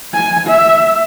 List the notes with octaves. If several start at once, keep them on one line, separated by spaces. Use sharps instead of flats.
G#5
E5